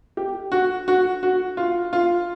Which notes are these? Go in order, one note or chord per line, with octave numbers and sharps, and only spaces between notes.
G4
F#4
F#4
F#4
F4
F4